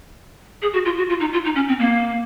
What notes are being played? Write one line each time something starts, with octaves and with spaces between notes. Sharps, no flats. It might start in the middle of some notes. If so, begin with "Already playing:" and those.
G#4
F#4
F4
F#4
F4
D#4
F4
D#4
C#4
C4
A#3